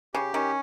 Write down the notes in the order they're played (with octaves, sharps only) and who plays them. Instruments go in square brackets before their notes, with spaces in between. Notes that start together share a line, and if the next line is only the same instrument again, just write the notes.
[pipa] C#3 [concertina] G4
[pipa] D#3 [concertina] C#4